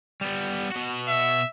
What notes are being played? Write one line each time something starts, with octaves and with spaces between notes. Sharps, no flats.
G3 B3
B2 F#4
E5